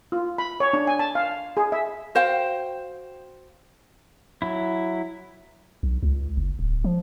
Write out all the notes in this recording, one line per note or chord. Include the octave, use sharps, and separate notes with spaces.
F4
B5
C#5
D4
G#5
A5
F5
G#4
E5
F#4 C5 F5 G5
F#3 E4
B1
C#2
F#1
D1
F3